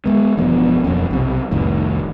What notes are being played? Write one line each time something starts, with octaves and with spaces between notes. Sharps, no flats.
G#3 B3
E1 G2 F3 B3
E1 F2 A#3 C#4
B1 C3
F1 C2 A2 D#3